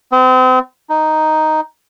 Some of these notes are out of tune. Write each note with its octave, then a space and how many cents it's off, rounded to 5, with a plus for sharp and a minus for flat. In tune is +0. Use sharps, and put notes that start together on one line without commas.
C4 -35
D#4 +0